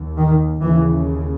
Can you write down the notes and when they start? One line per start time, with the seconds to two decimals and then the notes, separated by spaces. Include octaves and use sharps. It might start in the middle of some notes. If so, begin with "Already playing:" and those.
Already playing: D#2
0.18 D#3
0.63 D#2 C#3 E3